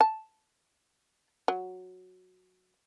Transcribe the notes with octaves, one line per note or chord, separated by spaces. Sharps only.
A5
F#3